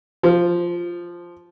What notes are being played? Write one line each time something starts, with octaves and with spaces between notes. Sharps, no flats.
F3